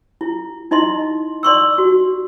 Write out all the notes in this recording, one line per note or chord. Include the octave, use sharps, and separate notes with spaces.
E4
D#4 E4 D#5 C6
D5 C6 C#6 E6
F#4